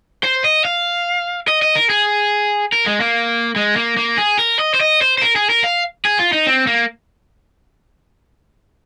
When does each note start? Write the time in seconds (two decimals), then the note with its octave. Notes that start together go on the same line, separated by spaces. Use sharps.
0.23 C5
0.44 D#5
0.65 F5
1.48 D#5
1.62 D#5
1.75 A#4
1.90 G#4
2.72 A#4
2.86 G#3
3.01 A#3
3.56 G#3
3.76 A#3
3.97 A#3
4.18 G#4
4.39 A#4
4.59 D#5
4.74 C5
4.81 D#5
5.02 C5
5.18 C5
5.22 A#4
5.36 G#4
5.50 A#4
5.64 F5
6.05 G#4
6.19 F4
6.33 D#4
6.47 C4
6.67 A#3